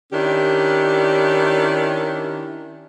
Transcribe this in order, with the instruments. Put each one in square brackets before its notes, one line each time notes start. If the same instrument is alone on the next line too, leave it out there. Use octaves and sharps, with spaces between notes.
[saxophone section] D#3 C#4 D4 E4 G4